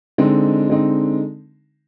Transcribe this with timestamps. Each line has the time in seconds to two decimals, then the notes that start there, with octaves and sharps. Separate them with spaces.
0.18 D3 G#3 C4 D#4
0.69 D3 G#3 C4 D#4